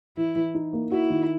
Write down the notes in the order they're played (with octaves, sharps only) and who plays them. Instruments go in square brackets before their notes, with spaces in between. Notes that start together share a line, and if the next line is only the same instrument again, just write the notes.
[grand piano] E3 [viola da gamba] E4
[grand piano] E3
D#4
A#3
[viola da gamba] E4 [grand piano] F#4
[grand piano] D#3